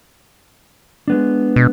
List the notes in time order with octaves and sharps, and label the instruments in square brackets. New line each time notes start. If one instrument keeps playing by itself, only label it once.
[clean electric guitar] G#3 B3 D4
[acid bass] B2